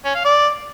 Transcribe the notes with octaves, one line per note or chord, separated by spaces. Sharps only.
C#4
F5
D5